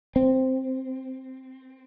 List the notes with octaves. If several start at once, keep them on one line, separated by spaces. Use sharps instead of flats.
C4